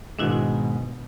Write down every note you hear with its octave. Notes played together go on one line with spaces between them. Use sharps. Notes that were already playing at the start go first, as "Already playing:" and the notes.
G#2 B2 D#3 G#3 D4 E4 F#4